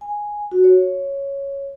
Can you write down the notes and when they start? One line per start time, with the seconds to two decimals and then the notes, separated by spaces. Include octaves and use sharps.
0.01 G#5
0.51 F#4
0.64 C#5